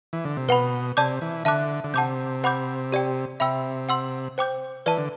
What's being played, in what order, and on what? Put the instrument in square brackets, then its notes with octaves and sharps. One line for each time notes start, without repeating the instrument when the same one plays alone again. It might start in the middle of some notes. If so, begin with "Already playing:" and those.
[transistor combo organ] E3
D3
C3
[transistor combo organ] B2 [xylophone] B4 F#5 B5
[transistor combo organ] C3 [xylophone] D5 A5 D6 G6
[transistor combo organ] E3
[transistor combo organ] D3 [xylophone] E5 A5 D6 F#6
[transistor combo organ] D3
[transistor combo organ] C3 [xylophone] F#5 A5 D6 G6
[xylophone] C5 F#5 B5 D6 G6
G4 D5 G5
[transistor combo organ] C3 [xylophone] E5 G5 B5 E6
[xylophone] F#5 C6 E6
C5 G5 D6 G6
[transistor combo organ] E3 [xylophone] B4 D5 A5
[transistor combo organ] D3